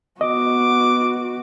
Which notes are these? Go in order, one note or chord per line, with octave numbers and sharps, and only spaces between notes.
B3 F#4 D#5 D6